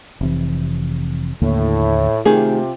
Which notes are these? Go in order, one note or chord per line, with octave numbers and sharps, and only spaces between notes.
F1 C3 E3
D#2 A2 D3 A#3
C3 D#3 A3 F4 G4 G#4